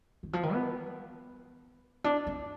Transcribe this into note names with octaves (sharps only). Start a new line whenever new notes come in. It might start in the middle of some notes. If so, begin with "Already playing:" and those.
D#3
F3
D#3
B3
D4
D4